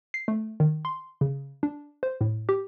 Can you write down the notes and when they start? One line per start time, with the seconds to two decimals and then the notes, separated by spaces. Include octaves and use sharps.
0.14 C7
0.28 A3
0.60 D#3
0.85 C6
1.21 C#3
1.63 D4
2.03 C5
2.21 A2
2.49 G4